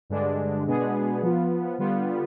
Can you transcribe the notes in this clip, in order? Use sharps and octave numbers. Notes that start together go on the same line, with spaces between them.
G2 D3 G#3 D4
B2 G#3 B3 D4 G#4
F3 B3 F4
D3 G3 B3 F4